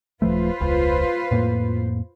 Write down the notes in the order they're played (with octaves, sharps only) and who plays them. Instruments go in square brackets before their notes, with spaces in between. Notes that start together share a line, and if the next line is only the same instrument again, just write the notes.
[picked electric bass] D#1 F3 A3 [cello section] F4 B4 C5
[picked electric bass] E1 C#2
F2 A2 A#3